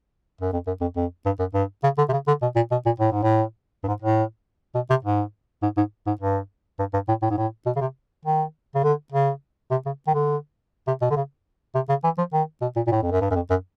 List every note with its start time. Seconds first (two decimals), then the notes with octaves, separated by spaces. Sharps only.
0.41 F#2
0.53 F2
0.67 F#2
0.81 F2
0.96 F2
1.26 G2
1.39 F#2
1.54 G2
1.84 C#3
1.98 D3
2.09 C3
2.13 C#3
2.27 D3
2.42 B2
2.56 A#2
2.71 B2
2.86 A#2
3.00 A2
3.12 G#2
3.23 A2
3.84 G2
3.88 G#2
4.02 A2
4.75 B2
4.90 C3
5.04 G#2
5.63 G#2
5.77 G#2
6.07 G#2
6.21 G2
6.79 G2
6.93 G2
7.08 A2
7.22 A2
7.31 G#2
7.37 A2
7.66 B2
7.76 C#3
7.81 C3
8.25 D#3
8.75 C#3
8.84 D3
9.12 C#3
9.71 C3
9.86 C#3
10.07 D#3
10.14 D3
10.87 C3
11.02 B2
11.11 D3
11.16 C#3
11.75 C3
11.89 C#3
12.04 E3
12.18 F3
12.33 D#3
12.62 B2
12.76 A#2
12.87 A#2
12.92 A2
13.02 F2
13.11 F#2
13.21 G2
13.31 F#2
13.35 F2
13.50 F#2